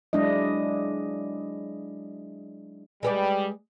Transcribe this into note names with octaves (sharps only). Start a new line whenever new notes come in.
F#3 G#3 D4 E4 D#5
G3 G#3 B4 D5